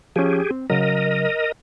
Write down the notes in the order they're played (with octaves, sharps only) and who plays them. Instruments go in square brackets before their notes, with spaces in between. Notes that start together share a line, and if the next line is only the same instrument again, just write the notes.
[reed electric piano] F3 C#4 [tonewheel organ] G4 G#4
[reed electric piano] C4
[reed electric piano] C#3 F#3 [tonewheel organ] A#4 D#5